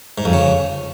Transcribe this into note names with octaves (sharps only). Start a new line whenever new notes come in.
G#2
F2
C#3